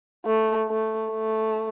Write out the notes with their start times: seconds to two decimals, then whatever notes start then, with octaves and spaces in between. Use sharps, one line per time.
0.25 A3
0.69 A3
1.11 A3